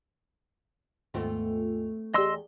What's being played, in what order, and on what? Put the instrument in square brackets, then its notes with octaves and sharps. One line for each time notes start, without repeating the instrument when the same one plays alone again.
[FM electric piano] D#2 G#2 F4 [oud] A3 B3 C4
[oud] E2 G#4 [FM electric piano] G4 D5 [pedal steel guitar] D#5 C6 E6